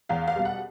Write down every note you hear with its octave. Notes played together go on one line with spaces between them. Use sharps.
E2 F5
F5
B2 G3
F#5